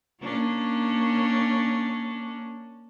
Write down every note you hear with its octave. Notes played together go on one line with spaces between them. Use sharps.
A#3 C#4 D4